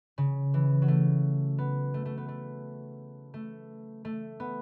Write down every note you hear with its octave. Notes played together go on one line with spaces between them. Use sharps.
C#3
E3
F#3
A3
B3
A3
A3
B3
A3
A3
A3
B3